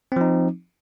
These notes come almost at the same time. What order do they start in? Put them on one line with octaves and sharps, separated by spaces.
C4 F3 D#4